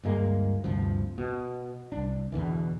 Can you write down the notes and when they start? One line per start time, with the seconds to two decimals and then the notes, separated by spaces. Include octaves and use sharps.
0.04 D2 G2 G#3 A#3
0.64 D2 G2 C3 F3
1.18 B2
1.92 C2 D4
2.32 E2 B2 D3 E3